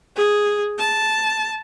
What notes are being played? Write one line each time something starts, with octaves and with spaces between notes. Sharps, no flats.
G#4
A5